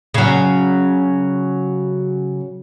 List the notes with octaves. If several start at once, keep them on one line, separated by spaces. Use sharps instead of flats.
C#3 F#3